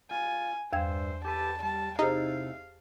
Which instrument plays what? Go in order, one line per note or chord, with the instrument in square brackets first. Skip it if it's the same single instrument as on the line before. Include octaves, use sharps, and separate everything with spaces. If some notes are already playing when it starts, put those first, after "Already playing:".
[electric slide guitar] F4 [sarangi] G#5
[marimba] E2 G5 G#6 [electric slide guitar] G2 E5 [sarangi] C5
[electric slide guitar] G4 A4 B4 [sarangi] A5
[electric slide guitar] G3 [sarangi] A5
[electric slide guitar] C3 A3 E4 [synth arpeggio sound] D#4 [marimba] G4 G#4 C5 [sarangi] F5